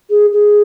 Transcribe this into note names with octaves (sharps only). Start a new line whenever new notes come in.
G#4
G#4